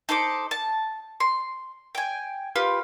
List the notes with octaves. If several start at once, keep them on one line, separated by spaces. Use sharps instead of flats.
D#4 A4 C5 D6
A5
C6
G5 G#5
F4 G4 B4